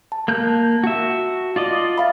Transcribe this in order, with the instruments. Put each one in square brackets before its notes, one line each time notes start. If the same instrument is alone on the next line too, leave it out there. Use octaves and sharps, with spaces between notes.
[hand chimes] A5
[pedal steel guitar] A#3 F#6 G6
F#4 E5
F4 D5 D#5
[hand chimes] E5 F5 B5